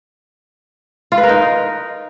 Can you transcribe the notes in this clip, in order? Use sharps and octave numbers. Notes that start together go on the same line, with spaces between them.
F4
B4
A#4
D#4